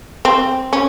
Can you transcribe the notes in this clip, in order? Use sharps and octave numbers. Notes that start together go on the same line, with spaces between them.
C4
C#4